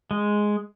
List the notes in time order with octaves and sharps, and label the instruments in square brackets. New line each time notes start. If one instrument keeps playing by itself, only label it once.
[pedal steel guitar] G#3